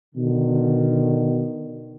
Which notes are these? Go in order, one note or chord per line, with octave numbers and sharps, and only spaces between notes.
B2 D3 D#3